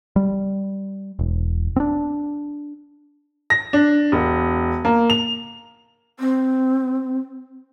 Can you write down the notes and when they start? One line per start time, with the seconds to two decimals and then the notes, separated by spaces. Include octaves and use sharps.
0.16 G3
1.19 E1
1.76 C4 D4
3.50 A#6
3.73 D4
4.12 E1
4.85 A#3
5.10 F7
6.19 C4